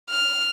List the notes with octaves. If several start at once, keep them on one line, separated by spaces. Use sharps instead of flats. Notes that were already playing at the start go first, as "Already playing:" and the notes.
F6